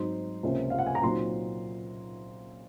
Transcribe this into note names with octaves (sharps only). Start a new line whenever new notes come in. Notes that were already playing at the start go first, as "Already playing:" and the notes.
Already playing: G#2 F#3 C4 D#4 C6
C#2 C3 F3 A#3 C#4
F5
F#5
G#5
A#5
A#2 F#3 C4 D#4 C6